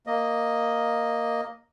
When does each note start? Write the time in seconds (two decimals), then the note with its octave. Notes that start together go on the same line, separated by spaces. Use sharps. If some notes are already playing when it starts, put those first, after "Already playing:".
0.07 A#3 D#5